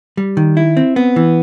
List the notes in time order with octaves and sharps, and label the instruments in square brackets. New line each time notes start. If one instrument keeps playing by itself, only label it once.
[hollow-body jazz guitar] G3
D#3
E4
C4
B3
E3